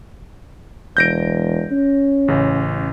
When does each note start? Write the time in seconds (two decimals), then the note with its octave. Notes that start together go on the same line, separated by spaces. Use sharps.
0.97 E1 G6 A#6 D7
1.71 C#4
2.28 A1 C#3